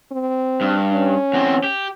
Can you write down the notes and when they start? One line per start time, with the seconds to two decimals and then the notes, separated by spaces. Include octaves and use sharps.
0.12 C4
0.61 G2
0.93 C#4
1.33 E2 C4
1.64 G4